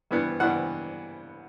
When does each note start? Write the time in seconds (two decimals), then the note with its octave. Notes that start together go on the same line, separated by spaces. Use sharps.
0.11 G2 E3 B3 D4
0.40 G2 E3 B3 D4 F#5